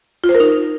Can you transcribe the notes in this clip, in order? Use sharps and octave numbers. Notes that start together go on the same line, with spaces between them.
F4
C5
A#4
D#4